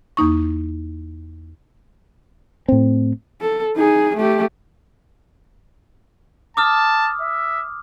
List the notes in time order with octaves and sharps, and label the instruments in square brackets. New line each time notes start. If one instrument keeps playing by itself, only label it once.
[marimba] E2 A#3 D#4 C#6
[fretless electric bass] A2 C4
[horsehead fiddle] A4
D#4 G#4
A3 G4
[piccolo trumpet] A5 [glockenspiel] D6 D#6 F6
[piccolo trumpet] E5